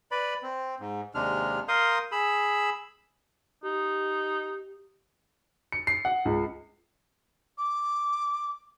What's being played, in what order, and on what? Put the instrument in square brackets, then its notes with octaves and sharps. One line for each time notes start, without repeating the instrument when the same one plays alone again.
[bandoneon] B4 D5 B5
C4
G#2
D#2 C3 G#3 D4 F6
A#4 F5 C6 D#6 G6
G#4 B5 E6
[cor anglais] D#4 [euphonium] G4
[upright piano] C#7
C7
F#5
C#2
[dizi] D6